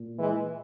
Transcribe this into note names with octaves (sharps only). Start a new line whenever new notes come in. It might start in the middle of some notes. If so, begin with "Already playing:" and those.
Already playing: A#2
E3 G#3